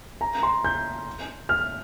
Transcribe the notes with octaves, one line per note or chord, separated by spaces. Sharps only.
A#5
C6
G6
F6